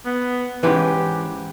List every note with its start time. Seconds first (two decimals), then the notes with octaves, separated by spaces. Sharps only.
0.06 B3
0.63 G#2 E3 G#3 C#4 G4 B4